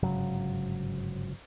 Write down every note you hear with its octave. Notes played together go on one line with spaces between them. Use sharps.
G1 G#2 C#3 F#3